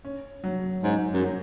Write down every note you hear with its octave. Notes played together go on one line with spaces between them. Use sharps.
C#4
F#3
G#2 C#4
F#2
F#3